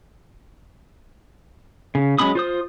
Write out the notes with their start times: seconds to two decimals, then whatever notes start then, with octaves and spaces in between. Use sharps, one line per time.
1.95 C#3
2.19 F#3 G#3 C#4 B5 D#6
2.35 F4 C5 D#6